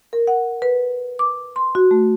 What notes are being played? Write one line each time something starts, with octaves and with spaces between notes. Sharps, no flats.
A#4
F#5
B4
D6
C6
F#4
A3